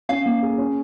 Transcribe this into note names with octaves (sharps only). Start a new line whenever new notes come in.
C#4 F5
A#3
G#4
C#4